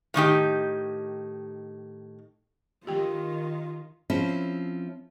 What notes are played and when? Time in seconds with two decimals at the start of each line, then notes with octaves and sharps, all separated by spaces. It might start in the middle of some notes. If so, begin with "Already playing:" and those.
0.14 A2 D#3 D#4 G4
2.87 D#3 F4 G4 G5
4.10 F3 C4 C#4 E4